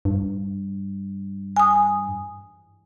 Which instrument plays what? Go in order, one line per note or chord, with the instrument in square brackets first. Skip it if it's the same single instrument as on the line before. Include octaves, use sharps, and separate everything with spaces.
[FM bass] G2
[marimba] G#5 D#6